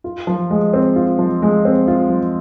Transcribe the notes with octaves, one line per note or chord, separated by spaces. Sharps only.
F4
F3
G#3
C4
F4
F3
G#3
C4
F4
F3